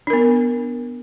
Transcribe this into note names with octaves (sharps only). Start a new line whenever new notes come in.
B3 D4 A#4